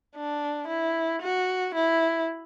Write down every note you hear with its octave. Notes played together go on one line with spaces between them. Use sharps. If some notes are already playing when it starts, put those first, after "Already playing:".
D4
E4
F#4
E4